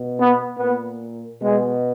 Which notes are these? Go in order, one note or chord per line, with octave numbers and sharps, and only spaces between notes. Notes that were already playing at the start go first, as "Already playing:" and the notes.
Already playing: B2
B3
A#2 B3
B2 G#3